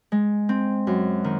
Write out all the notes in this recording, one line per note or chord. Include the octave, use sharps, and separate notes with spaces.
G#3
C4
F#2
D#3